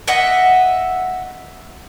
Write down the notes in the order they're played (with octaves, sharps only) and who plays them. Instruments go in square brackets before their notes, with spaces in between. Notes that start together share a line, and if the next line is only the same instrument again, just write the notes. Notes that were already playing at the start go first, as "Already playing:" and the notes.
[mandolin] D#5 E5 F#5